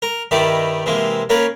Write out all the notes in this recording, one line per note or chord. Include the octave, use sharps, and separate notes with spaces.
A#4
G2 D#3 D#4 E4 D5
C3 E3 G#3 A#3
A#3 C#4 A#4 B4 C#5